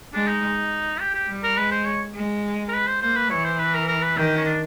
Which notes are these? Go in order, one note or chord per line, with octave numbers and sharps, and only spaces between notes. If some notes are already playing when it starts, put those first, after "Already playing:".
G#3 D4
D#4
G4
G4
G3
A#4
G#3 B4
C5
C#5
G#3
A#4
B4
C5
A#3 C5
B4
E3 C#5
C5
B4
A#4
A#4
B4
D#3 G4
G4
C#4
D4